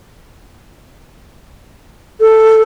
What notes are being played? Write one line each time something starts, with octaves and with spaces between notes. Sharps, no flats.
A4